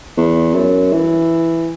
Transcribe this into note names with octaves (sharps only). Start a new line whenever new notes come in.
E2
F#2
E3